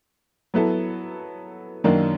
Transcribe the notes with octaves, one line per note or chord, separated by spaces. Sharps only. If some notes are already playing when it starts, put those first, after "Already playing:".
F#3 B3 E4 A4
F#2 D#3 F#3 A#3 D4